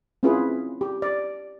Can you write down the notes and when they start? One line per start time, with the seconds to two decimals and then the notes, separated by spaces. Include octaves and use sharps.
0.23 C4 C#4 E4 F4 G#4 B4
0.81 G4
1.02 D5